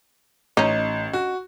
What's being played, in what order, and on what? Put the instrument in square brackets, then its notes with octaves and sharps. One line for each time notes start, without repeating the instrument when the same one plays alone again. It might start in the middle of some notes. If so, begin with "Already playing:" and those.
[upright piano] A1 [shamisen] C#4 D#4
[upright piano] F#4